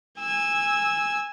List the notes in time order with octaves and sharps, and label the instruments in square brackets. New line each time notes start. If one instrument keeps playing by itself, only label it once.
[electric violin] G#5 E6